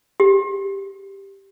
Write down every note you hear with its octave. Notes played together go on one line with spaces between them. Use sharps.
G4